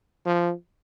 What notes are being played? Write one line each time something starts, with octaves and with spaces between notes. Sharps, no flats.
F3